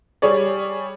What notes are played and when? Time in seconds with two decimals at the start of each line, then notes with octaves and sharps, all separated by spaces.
0.22 G3 G#4 C#5 D5